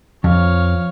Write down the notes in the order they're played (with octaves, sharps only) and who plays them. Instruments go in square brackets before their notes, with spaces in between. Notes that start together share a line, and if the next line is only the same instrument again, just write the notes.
[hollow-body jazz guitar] F2 [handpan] F3 [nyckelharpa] C#5 F5